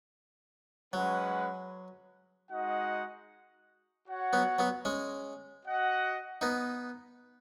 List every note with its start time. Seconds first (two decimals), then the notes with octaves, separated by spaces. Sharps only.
0.93 F#3 G#3 C#4 B4 F#5
2.50 G#3 D#4 F#4 D#5 F#5
4.08 F#4 C#5 F#5
4.33 F#3 B3
4.59 F#3 B3
4.85 G#3 C#4
5.63 F#4 D#5 F#5
6.41 B3 D#4